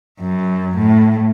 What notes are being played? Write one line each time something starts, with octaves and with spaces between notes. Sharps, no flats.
F#2
A2